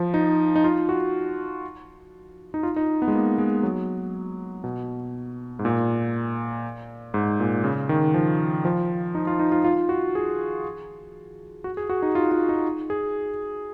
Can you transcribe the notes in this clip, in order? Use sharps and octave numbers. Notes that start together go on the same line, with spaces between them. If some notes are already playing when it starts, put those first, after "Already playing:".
Already playing: F3
D#4
D#4
F4
F#4
D#4
F4
D#4
B3
G#3
A#3
G#3
F#3
B2
G#2
A#2
G#2
A#2
C#3
D#3
F3
F3
D#4
F4
D#4
F4
F4
F#4
G#4
F#4
G#4
F#4
D#4
F4
F4
D#4
G#4